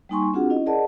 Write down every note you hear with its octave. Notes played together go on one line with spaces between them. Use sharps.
G3 A#3 D#4 G#5 C6 C#6
C4 D4 F4 F#4 G#4 F#5
C#4 E4 D#5
G#4 A#4 D5 D#5 F#5 A5